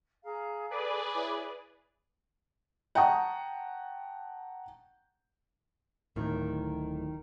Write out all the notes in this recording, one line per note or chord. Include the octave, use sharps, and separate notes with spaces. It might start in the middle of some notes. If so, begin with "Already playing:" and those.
G#4 F5 A#5
G#4 A4 B4 D5
E4 C#5
F#5 G5 A5 A#5 C#6 D#6
D1 A2 D#3